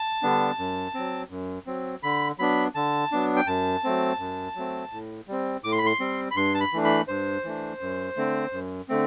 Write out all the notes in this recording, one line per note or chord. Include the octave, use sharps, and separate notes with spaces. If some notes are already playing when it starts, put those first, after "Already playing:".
Already playing: A5
D3 G3 B3 D4
F#2
F#3 C4
F#2
F#3 C4
D3 B5
F#3 B3 D4 B5
D3 A5
F#3 B3 D4
G5
F#2 A5
F#3 A3 C4
F#2
F#3 A3 C4
A2
G3 C4
A2 D6
C6
B5
C6
G3 C4
B5
G2 C6
A5
B5
E3 A3 D4
B5
G2 C5
E3 A3 D4
F#2
D3 A3 C4
F#2
D3 A3 C4